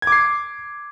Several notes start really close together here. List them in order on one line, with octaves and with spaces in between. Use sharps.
G#6 D6 C7